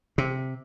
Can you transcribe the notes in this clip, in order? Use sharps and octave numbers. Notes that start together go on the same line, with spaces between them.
C3